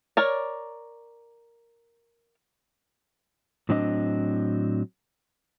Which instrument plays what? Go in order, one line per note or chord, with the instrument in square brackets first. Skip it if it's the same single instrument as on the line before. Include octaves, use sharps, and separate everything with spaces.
[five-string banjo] A#4 C#5 D5
[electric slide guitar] A2 F#3 C4 D4 D#5